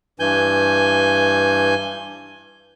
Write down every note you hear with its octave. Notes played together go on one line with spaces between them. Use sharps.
G2 E3 G#5 G6